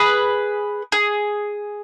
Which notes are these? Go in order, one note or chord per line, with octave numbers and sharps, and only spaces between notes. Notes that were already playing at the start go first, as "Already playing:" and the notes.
Already playing: G#4 B4
G#4